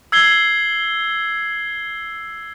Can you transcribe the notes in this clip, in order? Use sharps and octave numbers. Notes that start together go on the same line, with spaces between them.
E6 G#6 C7 G7